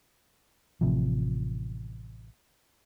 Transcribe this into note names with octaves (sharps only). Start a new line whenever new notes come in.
A1 C3 F3